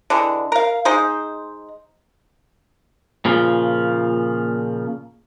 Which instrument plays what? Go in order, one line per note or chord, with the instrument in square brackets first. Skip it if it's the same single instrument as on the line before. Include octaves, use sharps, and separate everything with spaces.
[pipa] D3 E3 G#3
A#4 F5
G#3 D#4 C5
[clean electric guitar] A#2 C#3 F3